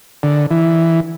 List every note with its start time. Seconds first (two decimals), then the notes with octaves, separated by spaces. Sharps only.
0.23 D3
0.51 E3